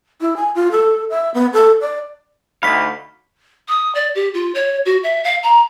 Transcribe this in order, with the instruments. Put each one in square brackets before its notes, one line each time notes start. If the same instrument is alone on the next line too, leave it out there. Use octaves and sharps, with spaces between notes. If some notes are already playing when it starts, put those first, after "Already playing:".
[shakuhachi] E4
G#5
F4
A4
E5
B3
A4
D5
[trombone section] D2 [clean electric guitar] D#4 F#4 F5 [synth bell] B5 B6
[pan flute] D#6
D5
G4
F4
C#5
F#4
E5
F5
A#5